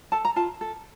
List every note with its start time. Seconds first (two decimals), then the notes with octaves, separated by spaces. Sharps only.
0.12 A4 A5
0.25 A#5
0.36 F4 A5
0.61 A4